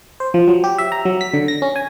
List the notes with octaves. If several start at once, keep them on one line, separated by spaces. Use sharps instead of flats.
C5
F3
F#3
G4
E5
A#5
F#3
B6
D3
A#6
C#4
G#5